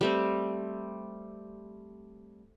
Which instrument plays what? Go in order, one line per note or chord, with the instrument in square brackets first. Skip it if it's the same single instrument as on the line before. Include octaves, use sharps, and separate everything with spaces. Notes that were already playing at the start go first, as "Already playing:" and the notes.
[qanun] G3 A3 C4